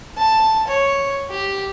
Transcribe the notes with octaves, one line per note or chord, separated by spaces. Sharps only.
A5
C#5
G4